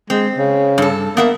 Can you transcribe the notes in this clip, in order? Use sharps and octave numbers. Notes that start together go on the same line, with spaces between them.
G#3 C4
C#3
G2 A4
A#3 B3 E5 F#5